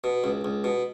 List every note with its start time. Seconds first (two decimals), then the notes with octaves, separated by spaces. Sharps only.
0.04 B2
0.24 C#2
0.45 C#2
0.64 B2